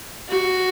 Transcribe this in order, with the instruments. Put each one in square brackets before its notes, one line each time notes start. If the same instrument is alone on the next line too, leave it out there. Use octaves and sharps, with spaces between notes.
[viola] F#4